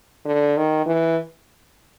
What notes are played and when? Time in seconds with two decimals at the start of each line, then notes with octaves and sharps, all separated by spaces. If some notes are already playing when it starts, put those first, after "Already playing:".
0.25 D3
0.57 D#3
0.86 E3